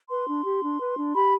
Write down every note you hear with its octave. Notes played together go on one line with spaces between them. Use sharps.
B4 C6
D4
G4
D4
B4
D4
G4 B5